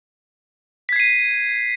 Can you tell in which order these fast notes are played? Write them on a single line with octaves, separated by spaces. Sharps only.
B6 G#6 C7 D#7